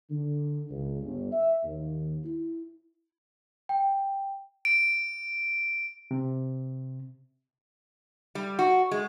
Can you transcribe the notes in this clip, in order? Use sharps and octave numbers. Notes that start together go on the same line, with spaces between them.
D3
C#2
G1
E5
D#2
E4
G5
D7
C3
G3
F#4
G#3